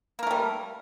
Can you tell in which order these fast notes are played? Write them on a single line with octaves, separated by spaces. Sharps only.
A#3 A#4 A3 G3